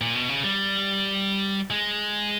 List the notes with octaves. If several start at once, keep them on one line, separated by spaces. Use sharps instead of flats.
A#2
B2
C#3
G3
G#3